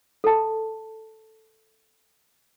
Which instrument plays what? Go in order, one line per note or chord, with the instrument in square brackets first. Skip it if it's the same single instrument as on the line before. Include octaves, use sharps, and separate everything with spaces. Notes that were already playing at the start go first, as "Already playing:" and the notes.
[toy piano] A4 A5